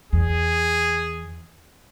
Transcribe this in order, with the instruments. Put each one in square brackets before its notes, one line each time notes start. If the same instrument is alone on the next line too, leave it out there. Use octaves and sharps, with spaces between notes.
[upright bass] E2 [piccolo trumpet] G#4